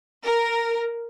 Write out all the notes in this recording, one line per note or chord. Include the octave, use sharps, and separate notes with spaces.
A#4